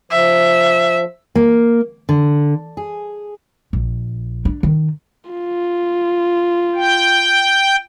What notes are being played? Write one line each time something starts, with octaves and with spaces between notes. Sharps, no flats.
F3 E5
A#3
D3
G#4
A#1
D4
D#3
F4
G5